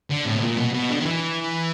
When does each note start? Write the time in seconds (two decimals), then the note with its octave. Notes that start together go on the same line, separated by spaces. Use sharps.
0.10 D3
0.25 A2
0.35 B2
0.42 A#2
0.58 B2
0.74 B2
0.90 D3
1.01 D#3
1.05 E3